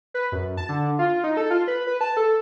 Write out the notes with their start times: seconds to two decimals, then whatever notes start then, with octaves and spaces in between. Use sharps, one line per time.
0.14 B4
0.32 F#2
0.57 A5
0.69 D3
0.99 F4
1.24 D#4
1.37 A4
1.50 F4
1.68 B4
1.87 B4
2.01 A5
2.17 A4